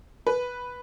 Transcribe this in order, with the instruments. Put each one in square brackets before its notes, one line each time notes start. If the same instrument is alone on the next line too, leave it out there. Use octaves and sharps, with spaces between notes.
[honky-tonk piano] B4